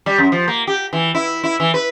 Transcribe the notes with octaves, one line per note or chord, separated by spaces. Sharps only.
G3
F#2
F3
A#3
G4
E3
E4
E4
E3
B4